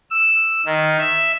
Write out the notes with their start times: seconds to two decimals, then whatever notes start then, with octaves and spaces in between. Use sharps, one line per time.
0.10 E6
0.66 D#3
0.99 E5